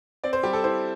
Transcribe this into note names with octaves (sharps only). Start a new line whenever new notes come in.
C4 D5
C5
G3 G4
A4
E4 C5